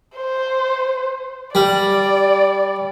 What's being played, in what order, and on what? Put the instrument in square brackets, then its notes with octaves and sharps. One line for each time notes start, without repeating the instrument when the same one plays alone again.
[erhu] C5
[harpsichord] G3 [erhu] D5